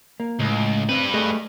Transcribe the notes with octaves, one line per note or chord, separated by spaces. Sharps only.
A#3
C#2 A2
G3 C4 B4
A3 G#4 D#5